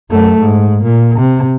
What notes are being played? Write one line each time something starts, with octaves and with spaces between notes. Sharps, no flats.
F#2 A3
G#2
A#2
C3